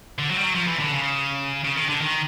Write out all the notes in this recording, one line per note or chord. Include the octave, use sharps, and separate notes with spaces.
D3
F#3
G3
F#3
F3
E3
D3
C#3
C#3
D#3
D3
D#3